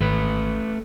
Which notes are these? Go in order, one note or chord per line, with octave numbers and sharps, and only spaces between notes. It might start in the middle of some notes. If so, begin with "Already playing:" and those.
G#1 A3 B4